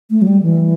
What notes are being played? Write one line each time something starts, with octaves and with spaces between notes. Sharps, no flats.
A3
F#3
G3
E3